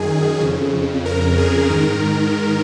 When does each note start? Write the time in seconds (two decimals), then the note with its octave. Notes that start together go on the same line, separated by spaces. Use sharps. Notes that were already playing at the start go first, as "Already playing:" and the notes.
Already playing: F#2 D#3 G#4
0.40 F2 C#3
1.05 A#4
1.38 G#4
1.70 G#2 D#3 A#4